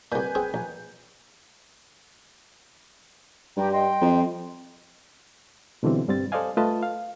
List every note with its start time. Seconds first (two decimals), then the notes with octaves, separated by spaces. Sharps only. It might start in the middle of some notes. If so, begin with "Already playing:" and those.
0.12 C2 A#2 B4 G#5 G6
0.35 C4 G#4
0.54 A#1
3.57 G2 G4 G5 A#5
3.71 D#5 G5 C6
4.01 F2
5.83 B2 D3 E3 G3 C4
6.08 G2 G3 C4 A6
6.32 A4 C5 D5 D#5 F5 G#5
6.57 A3 F4 B4 D#5 A5
6.83 F5